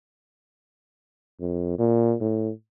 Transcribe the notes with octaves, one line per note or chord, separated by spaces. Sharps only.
F2
A#2
A2